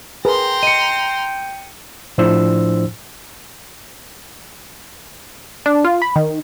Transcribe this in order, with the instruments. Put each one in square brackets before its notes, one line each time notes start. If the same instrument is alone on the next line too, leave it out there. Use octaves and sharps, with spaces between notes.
[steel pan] G#4 A#4 B4 [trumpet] G5 [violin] A#5 C6
[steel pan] D#5 [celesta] C#7 D#7
[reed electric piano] A2 F3 D4 E4 C5 E6
[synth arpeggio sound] D4
F4
B5
D#3